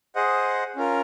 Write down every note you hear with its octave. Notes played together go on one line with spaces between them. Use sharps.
G#4 C5 D#5 F#5
C#4 F4 A#4